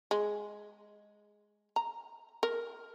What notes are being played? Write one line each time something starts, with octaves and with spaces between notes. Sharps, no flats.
G#3
A#5
A#4